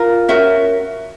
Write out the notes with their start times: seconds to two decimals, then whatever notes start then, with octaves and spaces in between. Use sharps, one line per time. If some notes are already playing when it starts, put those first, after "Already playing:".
Already playing: F4 A#4
0.29 C#4 F#4 A#4 E5